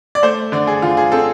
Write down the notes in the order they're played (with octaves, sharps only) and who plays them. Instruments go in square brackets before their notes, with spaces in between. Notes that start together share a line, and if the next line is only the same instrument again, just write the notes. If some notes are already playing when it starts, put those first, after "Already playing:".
[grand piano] D5
A3 C5
D3 D5
G#4
D3 F4
G#4
C4 A4